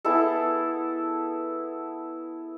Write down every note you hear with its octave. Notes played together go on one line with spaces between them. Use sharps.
B3 E4 G#4 A4